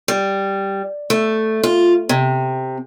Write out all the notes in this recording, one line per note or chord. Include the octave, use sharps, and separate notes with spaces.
G3
A3
F4
C3